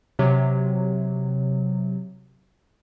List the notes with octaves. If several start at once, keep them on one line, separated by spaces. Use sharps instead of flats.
C3 F#3